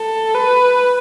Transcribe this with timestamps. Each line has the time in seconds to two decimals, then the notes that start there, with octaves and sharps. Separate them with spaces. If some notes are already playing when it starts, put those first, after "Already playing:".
Already playing: A4
0.35 B4